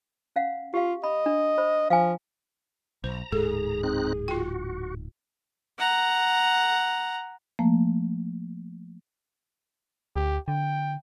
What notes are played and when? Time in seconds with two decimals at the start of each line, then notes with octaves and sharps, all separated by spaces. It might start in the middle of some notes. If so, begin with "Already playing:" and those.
0.36 C#4 F5 F#5
0.74 F4 G4 F5
1.04 D#5 B5
1.26 D4
1.58 C5 B5
1.90 F3 F5 G#5
3.04 B1 C5 A#5
3.32 D1 G#2 G#4 A4
3.83 C4 D#4 F#6
4.28 F4 F#4 G5
5.79 F#5 A#5
7.59 F3 A3 A#3
10.16 D2 G4
10.48 D3 G5